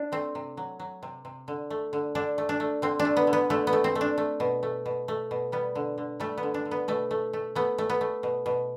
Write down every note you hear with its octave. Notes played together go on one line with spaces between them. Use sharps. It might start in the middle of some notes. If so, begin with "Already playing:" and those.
Already playing: D4
A3 C4
C3
F#3
F#3
C3
C3
D3
A3
D3
D3 D4
A3
D4
A3
D3 C4
D4
A3
B3
D3
B3
D3 A3
B3
A3
C4
A3
D4
A3
B2
A3
B2
A3
B2
G3 B3
D3
D3
G3 A3
B3
D3
D4
D3
B3
B2 A3
A3
A3
A3 B3
A3
B3
A3
B2
B2